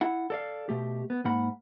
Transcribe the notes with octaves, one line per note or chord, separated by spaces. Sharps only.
E4 F#5
A4 D5 F5
B2 A3 G4
B3
G#2 A#3 F#5 B5